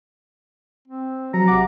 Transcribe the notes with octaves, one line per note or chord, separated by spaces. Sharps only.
C4
F3 F#3 A#5
G#1 C3 F#5 D6